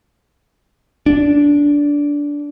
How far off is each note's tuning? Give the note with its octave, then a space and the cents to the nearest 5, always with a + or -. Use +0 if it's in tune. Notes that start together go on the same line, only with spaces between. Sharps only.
D4 -15